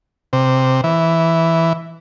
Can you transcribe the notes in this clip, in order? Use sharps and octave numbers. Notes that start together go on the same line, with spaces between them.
C3
E3